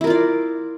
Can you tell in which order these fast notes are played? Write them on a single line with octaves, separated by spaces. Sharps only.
E4 A#4 F4 D5